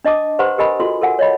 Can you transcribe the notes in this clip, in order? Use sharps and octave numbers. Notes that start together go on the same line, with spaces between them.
D4 D#5 A5 D6 D#6
G4 B4 C5 F#5 A#5 C6
G4 A#4 D#5 G#5 B5 D#6
F4 F#4 A4 C6
A4 A#4 F#5 G#5
C#5 D#5 B5